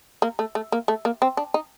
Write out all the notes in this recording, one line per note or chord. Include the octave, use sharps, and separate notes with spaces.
A#3
A3
A3
A#3
A3
A#3
C4
D4
D#4